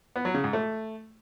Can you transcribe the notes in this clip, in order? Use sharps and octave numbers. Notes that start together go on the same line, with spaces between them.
B3
F#3
C#3
G#2
A3